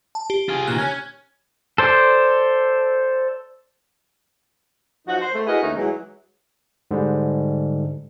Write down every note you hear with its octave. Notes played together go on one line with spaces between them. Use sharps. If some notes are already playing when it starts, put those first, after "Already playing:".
A5
G4
F4 G#4
A#2 D#3 F6 F#6
C#4 F6 G#6
A4 C5 D5
F3 F#3 D#4 F#4
C5
A3
E4 F#4 G#4 A#4 B4 D#5
D#2 A3 C#4 D#4
E3 F#3 G#3
G#2 D3 G3